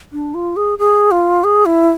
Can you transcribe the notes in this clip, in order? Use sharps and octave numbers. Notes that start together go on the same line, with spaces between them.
D4
F4
G#4
G#4
F4
G#4
E4